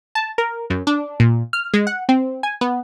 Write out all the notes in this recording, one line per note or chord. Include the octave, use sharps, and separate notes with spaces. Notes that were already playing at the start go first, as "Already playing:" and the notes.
A5
A#4
F#2
D4
A#2
F6
G#3
F#5
C4
G#5
B3